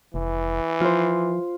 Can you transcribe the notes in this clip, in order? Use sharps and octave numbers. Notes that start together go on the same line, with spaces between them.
F1 E3
F3 F4 C5